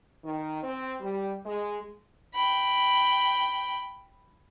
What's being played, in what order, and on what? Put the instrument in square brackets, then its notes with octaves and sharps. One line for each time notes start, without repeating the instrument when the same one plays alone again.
[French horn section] D#3
C4
G3
G#3
[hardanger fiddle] G5 B5